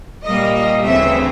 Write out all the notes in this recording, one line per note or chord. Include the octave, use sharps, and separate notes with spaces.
A#2 G3 A#3 D#5
D#5
D2 C#3 E3 A3 C4 E5